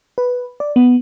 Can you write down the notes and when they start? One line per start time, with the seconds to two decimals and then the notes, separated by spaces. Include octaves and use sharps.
0.18 B4
0.60 D5
0.76 B3